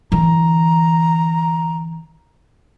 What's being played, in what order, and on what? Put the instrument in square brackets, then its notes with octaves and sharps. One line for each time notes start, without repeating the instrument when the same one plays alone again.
[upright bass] D3 E3 [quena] A#5